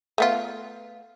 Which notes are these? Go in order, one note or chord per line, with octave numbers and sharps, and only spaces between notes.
A3 B3 F4